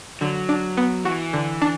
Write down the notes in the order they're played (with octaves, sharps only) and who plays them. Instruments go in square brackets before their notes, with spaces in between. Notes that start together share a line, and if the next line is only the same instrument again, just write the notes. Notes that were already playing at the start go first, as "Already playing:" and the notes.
[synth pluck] D3 [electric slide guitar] F#3
[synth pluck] D4
B3
[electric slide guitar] E3 [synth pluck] F#4
[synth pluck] D3
D4